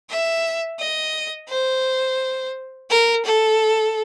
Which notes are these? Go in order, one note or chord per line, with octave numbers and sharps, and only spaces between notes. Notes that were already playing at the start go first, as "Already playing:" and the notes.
E5
D#5
C5
A#4
A4